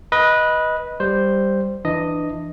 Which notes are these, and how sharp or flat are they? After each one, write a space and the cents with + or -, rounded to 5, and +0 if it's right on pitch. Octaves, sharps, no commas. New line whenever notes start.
B4 -15 D#5 +10
G3 +0 C5 +0
E3 +10 D4 +25 D#5 +0